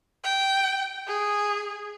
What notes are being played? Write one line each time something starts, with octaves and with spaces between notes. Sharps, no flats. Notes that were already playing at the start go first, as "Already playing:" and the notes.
G5
G#4